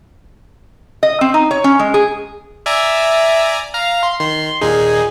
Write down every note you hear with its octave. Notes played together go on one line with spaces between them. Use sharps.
D#5
C4
D#4
C#5
C#4
G#3
G#4
D5 E5 G#5 A#5
F5 A#5
C6
D#3 C6
D#2 A#2 D#4 G#4